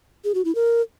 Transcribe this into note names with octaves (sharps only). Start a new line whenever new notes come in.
G#4
F#4
E4
A#4